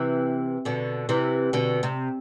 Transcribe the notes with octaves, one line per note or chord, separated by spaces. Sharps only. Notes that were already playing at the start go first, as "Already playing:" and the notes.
Already playing: C3 E3
B2 D3
C3 E3
B2 D3
C3